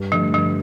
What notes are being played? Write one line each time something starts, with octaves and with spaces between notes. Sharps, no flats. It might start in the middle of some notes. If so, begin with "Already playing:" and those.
Already playing: G2
D3 F3 A3 D4
G2 F3